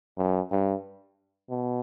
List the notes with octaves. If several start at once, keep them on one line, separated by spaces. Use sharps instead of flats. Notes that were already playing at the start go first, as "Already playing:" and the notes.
F#2
G2
B2